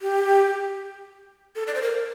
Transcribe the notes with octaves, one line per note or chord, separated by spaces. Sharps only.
G4
A4
D5
C5
A#4